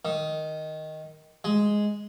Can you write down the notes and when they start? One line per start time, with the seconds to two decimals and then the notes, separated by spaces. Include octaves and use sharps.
0.05 D#3
1.44 G#3